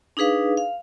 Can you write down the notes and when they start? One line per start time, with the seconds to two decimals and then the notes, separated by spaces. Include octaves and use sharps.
0.17 D4 D#4 G#4 B4 F5
0.57 F5